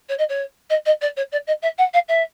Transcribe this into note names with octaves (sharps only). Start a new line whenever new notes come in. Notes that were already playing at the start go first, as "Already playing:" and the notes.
C#5
D#5
C#5
D#5
D#5
D5
C#5
D5
D#5
E5
F#5
F5
E5